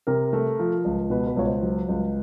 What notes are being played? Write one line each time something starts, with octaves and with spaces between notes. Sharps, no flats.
C3 A#4
A3
F3
C#2
B2 B4
B4
C#2 C#5
C5
F#3
C#2